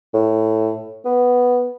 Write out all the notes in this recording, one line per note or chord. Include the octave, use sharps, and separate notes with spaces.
A2
B3